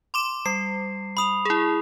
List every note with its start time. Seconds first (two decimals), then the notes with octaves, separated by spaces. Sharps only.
0.14 C6 D6 E7
0.46 G3 C7
1.17 B5 D#6 F7
1.45 E4 G#4